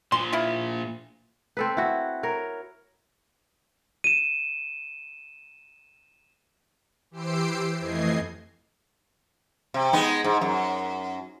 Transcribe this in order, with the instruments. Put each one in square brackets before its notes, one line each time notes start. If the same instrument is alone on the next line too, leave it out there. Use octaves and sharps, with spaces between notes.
[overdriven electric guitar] A#2 F3 [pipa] C6
[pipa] E4 F4
[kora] C4 A4 B4
E4 F#4
A#4 C#5
[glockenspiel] D#7 E7
[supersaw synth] E3 G4 C5 E6 C7 D7
F2 E3 A3 D#5 G#6 C7
[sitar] C3
G#3 B3 D#4
G#2
F#2